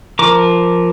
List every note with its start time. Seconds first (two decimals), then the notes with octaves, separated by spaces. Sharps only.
0.19 F3 A#4 D6